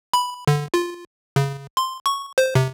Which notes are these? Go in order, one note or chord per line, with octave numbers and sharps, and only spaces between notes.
B5
D3
F4
C#3
C6
C#6
C5
C3